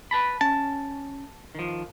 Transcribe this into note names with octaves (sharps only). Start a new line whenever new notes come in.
B4 A5 B5
C#4 A5
D#3 F3